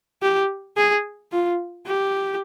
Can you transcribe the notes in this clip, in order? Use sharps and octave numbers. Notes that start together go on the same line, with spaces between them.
G4
G#4
F4
G4